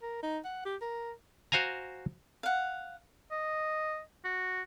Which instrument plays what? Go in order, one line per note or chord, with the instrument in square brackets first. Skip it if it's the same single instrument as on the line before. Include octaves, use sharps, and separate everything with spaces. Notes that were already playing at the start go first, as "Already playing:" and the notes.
[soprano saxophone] A#4
D#4
F#5
G4
A#4
[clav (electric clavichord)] F#4 C5 F5 G#5 A#5
[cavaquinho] F5 F#5
[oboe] D#5
F#4